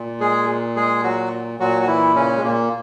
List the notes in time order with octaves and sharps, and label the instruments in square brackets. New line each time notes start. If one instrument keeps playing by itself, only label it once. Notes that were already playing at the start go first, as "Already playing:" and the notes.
Already playing: [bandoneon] A#2
G#3 G#4
G#3 G#4
F#3 F#4
A#2 F#3 F#4
F#4
E3 E4
C#3 C#4
G#3
A#2 A#3